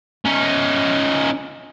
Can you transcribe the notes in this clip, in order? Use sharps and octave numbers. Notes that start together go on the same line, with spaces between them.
C#4 D#4